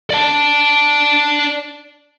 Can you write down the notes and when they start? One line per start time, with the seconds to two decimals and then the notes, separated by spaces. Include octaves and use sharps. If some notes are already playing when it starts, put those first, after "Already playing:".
0.10 D5 A5